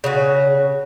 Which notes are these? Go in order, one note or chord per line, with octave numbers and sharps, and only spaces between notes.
C#3 F#4